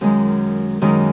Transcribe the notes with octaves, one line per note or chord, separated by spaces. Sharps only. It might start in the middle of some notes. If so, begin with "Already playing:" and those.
F#2 D#3 G#3
F#2 D#3 G#3